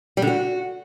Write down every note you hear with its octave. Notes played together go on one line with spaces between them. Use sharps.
G3
D3
F#4